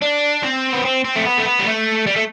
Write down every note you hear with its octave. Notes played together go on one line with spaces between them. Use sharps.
D4
C4
B3
C4
C4
A3
B3
A3
B3
G3
A3
G3
A3